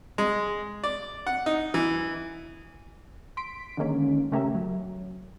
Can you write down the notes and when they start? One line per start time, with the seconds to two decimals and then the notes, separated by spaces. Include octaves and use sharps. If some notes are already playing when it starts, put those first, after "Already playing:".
0.18 G#3
0.84 D5
1.27 F#5
1.46 D#4
1.74 E3
3.37 C6 B6 D7
3.77 D3 D#3 G#3 A#3 C#4
4.32 C#3 A3 C#4 G4 A#4 E5
4.55 F#3